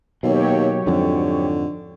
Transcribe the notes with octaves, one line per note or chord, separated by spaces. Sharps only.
D#2 B2 F#3 G4 C#5
F2 G#2 D3